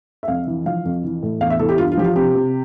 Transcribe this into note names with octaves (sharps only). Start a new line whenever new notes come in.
E5
F2 F5
E3
F3 F5
F2
E3
A2
E2 F5
E5
E3 A4
G4
G2 F4
F4
F3 G4
F4
C3 G4
C3